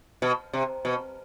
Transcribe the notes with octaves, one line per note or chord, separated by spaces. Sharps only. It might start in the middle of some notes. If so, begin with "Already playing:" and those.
B2
C3
B2